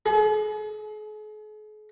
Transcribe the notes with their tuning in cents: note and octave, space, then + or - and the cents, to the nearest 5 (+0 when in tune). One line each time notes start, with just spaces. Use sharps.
G#4 +45